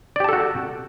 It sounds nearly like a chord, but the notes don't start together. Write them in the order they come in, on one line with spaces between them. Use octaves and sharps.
D5 G4 A5 A4 F#4